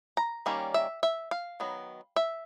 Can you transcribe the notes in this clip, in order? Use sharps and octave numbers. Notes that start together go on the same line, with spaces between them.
A#5
D#3 G3 A#3 C#4
E5
E5
F5
D#3 F#3 B3
E5